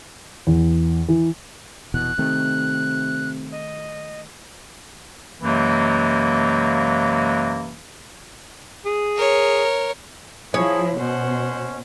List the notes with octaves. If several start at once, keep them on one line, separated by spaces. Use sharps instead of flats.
E2
E3
F1 B2 E3 F#6
C3 D#3 A3
D#5
F#2 C3 E3 F#3 G#3 A#3
G#4
A#4 C#5
F3 E4 G#4 C#5
B2 C#4 C5 F#5